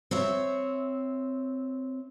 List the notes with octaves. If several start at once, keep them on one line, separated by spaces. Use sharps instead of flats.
C4 C#5 E5